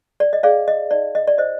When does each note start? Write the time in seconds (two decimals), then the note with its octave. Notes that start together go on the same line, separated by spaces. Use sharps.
0.20 D5
0.33 D#5
0.43 G#4 D5 F5
0.68 D#5
0.91 D#4 D5
1.15 D#5
1.27 D5
1.38 C5 D#5